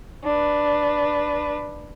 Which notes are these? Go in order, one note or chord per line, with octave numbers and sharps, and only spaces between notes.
D4 B4